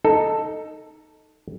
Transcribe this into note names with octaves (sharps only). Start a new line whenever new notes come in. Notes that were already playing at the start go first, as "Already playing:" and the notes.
D#4 A4